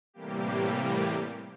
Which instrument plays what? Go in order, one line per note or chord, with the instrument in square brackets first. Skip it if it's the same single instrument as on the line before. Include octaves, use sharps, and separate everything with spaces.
[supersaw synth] A2 C3 E3 G3 A#3 G4